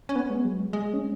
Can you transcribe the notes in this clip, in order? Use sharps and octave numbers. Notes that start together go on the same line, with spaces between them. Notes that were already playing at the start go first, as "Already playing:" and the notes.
C#4
B3
G#3
F#3
G#3
G#3
C#4